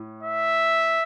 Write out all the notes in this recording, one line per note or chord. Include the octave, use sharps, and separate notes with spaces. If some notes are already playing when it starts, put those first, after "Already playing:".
Already playing: A2
E5